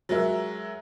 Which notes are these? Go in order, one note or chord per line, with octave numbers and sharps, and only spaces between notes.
F#3 G#3 F#4 A#4 E5